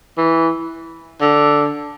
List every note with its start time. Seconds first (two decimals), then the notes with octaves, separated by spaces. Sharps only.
0.18 E3
1.21 D3